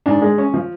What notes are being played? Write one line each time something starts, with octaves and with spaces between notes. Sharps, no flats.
G#2 D4
G#3
C#4
F3